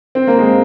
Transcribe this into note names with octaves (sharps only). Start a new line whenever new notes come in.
C4
A#3
G#3